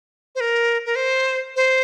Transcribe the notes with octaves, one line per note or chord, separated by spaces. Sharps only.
C5
A#4
A#4
C5
C5